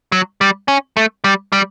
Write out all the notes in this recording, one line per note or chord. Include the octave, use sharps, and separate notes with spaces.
F#3
G3
C#4
A3
G3
G3